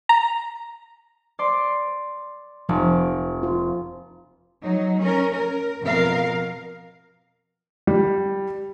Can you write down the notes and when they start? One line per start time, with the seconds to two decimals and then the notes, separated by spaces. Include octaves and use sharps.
0.09 A#5
1.39 D5 C6
2.69 F1 F3
3.43 F4
4.63 F#3 D#4
5.00 C#4 A#4
5.33 A#4
5.81 F2 B2 B3 A#4 F5
7.87 G3